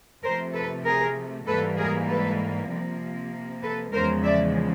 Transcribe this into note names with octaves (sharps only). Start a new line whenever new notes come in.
C3 F3 A3 A#4 C5
A4 B4
G#4 A#4
G#2 E3 G3 A#3 A4 B4
G#4 A#4
A4 B4
C3 F3 A#3
A4 B4
E2 C#3 F3 G#3 A#4 C5
D5 E5